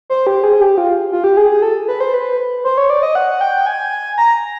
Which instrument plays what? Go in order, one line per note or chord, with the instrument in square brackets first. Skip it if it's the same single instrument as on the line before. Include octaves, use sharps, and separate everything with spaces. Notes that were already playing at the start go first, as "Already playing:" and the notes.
[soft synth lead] C5
G4
G#4
G4
F4
F4
G4
G#4
G#4
A4
B4
C5
B4
C5
C#5
D5
D#5
F#5
G5
G#5
A#5